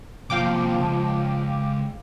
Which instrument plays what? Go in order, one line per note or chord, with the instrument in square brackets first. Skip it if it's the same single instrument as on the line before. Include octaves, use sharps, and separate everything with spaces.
[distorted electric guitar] C3 A#3 [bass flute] F3 [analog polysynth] F5 G5 D6
[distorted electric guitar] C#2 G#2